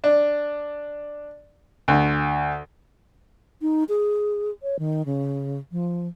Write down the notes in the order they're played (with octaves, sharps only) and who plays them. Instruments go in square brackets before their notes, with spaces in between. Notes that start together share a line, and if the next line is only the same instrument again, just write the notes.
[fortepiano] D4
D2
[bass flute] D#4
G#4
C#5
D#3
C#3
F3